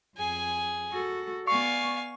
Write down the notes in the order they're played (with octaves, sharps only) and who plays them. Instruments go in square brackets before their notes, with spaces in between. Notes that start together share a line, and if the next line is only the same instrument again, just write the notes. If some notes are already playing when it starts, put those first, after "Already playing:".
[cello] F2 [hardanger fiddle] G#4 G#5
[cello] F#4 A4
[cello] B3 D5 [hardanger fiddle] F5 G#5 [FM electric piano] C#6